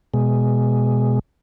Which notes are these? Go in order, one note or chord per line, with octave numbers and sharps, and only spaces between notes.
B2 G#3